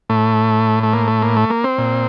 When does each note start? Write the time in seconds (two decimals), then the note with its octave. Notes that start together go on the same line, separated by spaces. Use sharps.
0.10 A2 A3
0.83 A3
0.93 A#3
1.08 A3
1.22 A#3
1.36 A3
1.50 A#3
1.64 C4
1.78 A#2